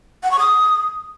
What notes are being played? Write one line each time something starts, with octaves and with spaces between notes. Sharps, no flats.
F#5
C#6
D#6